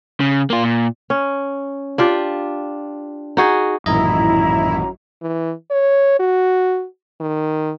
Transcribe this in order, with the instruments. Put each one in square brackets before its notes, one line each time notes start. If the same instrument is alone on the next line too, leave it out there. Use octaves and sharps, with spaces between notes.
[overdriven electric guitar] C#3
A#3 F4
A#2
[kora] C#4
D4 F4 G4
D#4 F#4 G#4
[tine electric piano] A1 D#3 D#5 [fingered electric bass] F#2 A#2 [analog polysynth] E4 [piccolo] A#5
[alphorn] E3
C#5
F#4
D#3